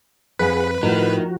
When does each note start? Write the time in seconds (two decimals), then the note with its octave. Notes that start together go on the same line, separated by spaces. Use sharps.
0.39 F2 G#4 B4 F#5 B5
0.83 A2 F3 D#4 F#4 A#4